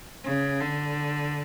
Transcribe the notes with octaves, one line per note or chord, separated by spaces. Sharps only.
C#3
D3